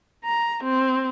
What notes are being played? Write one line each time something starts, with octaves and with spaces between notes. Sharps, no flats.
A#5
C4